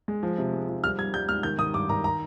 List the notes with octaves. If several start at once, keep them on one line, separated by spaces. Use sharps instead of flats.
G#3
F3
C3
G#3
F3
G3 F6
G3 G#6
G3 G6
G#2 F6
D#3 G6
D#3 D#6
G2 D6
D#3 A#5
A#5